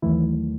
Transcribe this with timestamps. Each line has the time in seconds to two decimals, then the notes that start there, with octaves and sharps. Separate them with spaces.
0.02 D#2 D#3 E3 F#3 A3 E4